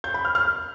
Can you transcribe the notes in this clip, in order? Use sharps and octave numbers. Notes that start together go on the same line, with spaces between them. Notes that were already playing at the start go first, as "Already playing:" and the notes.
G6
B5
F6
F6